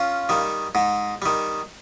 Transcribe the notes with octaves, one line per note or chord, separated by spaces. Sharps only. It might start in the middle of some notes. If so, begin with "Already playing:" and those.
Already playing: C#4 F4
D#3 G3
G#2
D#3 G3